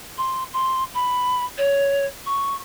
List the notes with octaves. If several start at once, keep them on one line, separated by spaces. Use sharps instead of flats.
C6
C6
B5
C#5
C#6